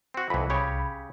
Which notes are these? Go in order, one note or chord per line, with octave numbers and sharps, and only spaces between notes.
C4 F#4
C2 F2 E3 B5
C#3 G4 C#5